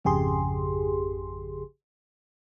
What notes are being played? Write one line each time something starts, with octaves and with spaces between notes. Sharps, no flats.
G#1 F2 C#3 G4 G#4 C6